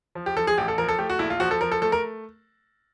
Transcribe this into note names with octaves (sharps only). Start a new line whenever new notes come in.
F3
G4
F3 A4
G#4
A1 G4
A4
F3 A#4
A4
A3 G4
F#4
A#1 E4
F4
F3 F#4
A4
F3 A#4
A4
A3 A4
A#4